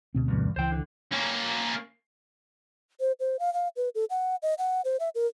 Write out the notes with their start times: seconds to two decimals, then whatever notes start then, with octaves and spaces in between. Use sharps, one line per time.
0.15 D2 B2 C4
0.28 E2 G2
0.56 C#2 E3 C5 G5
0.71 D3
1.12 A#3 C#4
3.00 C5
3.20 C5
3.39 F5
3.54 F5
3.76 B4
3.95 A4
4.10 F#5
4.43 D#5
4.58 F#5
4.85 C5
5.00 E5
5.15 A#4